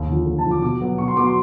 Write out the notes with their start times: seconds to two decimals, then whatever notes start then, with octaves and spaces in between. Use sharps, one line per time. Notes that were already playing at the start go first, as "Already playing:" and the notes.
Already playing: D#2
0.09 D3 F3
0.26 D#2
0.38 A5
0.45 D3 F3
0.51 D6
0.62 B2 D6
0.81 F#3 B3
0.98 B2 C#6
1.08 C6
1.17 F#3 B3 D6
1.26 C6